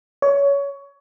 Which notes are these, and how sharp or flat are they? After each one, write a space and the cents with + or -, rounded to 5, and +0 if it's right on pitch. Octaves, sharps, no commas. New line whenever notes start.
C#5 +20